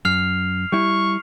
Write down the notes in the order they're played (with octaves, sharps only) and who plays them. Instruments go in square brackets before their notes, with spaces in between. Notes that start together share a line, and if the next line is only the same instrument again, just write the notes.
[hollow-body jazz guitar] F#2 [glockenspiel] F6 C7 F7
[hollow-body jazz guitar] G3 E4 [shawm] C#6